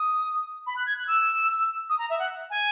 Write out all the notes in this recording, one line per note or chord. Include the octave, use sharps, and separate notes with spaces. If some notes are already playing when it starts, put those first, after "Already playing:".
Already playing: D#6
B5
F#6
G#6
F#6
E6
D#6
A#5
E5
F#5
G#5